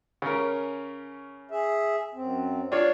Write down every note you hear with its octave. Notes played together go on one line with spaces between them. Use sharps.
C#3 C#4 A#4
G#4 E5
F#2 C4
D4 F4 C#5